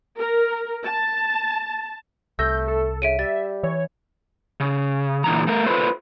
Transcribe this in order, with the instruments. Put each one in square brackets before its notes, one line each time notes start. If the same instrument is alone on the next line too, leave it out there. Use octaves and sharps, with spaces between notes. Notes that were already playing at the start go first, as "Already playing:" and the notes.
[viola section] A#4
A5
[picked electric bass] C2 [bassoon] A3 [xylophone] E6 A#6 [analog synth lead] G6
[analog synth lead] A4
[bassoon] C#3 [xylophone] E5 D7 D#7
[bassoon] G3 [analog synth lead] E5 [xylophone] A6
[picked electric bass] E3 [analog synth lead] C#5
[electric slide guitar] C#3
A#2 D3 E3 A#5
A3 A#4
F4 A4 B4 C5